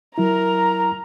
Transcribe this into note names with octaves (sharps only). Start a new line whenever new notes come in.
F#3 E4 A#4 A#5